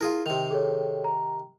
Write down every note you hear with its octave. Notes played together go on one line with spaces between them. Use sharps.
E4 F4 G#4 A#4
C3 D#3 F7
G#4 A4 C#5
A#5